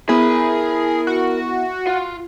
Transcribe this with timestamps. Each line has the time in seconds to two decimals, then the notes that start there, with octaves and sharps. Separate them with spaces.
0.09 B3 E4 G#4 A#4 E5 B5
1.07 F#4
1.87 F4